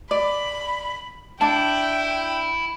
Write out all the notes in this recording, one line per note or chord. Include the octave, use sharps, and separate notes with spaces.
D5 B5
D4 E4 G5 A5